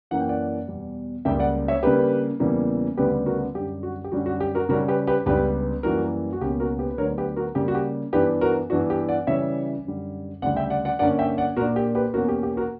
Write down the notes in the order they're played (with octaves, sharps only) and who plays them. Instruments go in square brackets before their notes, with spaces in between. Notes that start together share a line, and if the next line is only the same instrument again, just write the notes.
[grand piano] F#2 E3 A#3 C#4 F#5
G5
D5 F#5
E2 B2 G3
C#2 C#3 G3 A#3 E5 G5
D5 F#5
C#5 E5
C#3 G3 A#3 D4 G4 B4
E2 C#3 E3 G3 A#3
D2 C#3 G3 B3 G4 B4
F#4 A#4
F#2 D3 G3 G4
F#4
G4
F#2 D3 G3 C#4 F#4
F#4
G4
F#4 A#4
C#3 G3 C#4 F#4 A#4
G4 B4
G4 B4
C#2 C#3 G3 B3 D4 G4 B4
F#2 E3 G3 A#3 F#4 A#4
F#4
C#2 B2 A#3 C#4 G4
F#4 A#4
G4 B4
B4
D2 D3 F#3 B3 D4 A#4 C#5
G4 B4
F#4 A#4
C#3 G3 A#3 G4
F#4
G4
G2 E3 B3 D4 G4 B4
F#4 A#4
G2 E3 B3 D4 F#4
G4
D5 F#5
C#3 E3 G3 C#4 C#5 E5
F#2 D3 G3
D2 C#3 G3 D5 F#5
E5 G5
D5 F#5
D5 F#5
G2 D3 A#3 C#4 D5 F#5
E5 G5
D5 F#5
A#2 A#3 D4 F#4 A#4
G4
G4 B4
E2 B2 A#3 C#4 F#4 A#4
G4
G4
F#4 A#4